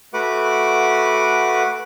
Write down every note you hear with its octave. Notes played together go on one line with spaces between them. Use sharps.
A3 F#4 B4 F#5 D6